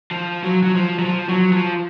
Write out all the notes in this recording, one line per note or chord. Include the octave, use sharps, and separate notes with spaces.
F3
F#3
F#3
F3
F#3
F3
F#3
F3